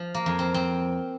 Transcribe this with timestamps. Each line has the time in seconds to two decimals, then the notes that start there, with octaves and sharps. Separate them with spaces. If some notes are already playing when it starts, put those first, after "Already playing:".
Already playing: F3
0.14 A#3
0.26 F2
0.39 C4
0.54 C4